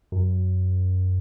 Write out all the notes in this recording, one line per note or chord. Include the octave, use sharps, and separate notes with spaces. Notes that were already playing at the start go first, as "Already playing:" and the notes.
F#2